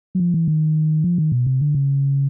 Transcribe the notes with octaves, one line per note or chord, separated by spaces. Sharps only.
F#3
F3
E3
D#3
F3
D#3
B2
C3
D3
C#3